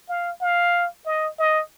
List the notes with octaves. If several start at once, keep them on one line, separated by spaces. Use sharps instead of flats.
F5
F5
D#5
D#5